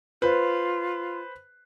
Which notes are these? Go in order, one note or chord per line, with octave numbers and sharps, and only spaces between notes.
F4 B4 C5